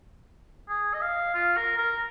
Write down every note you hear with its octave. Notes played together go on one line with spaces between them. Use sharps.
G#4
D#5
F5
F4
A#4
A#4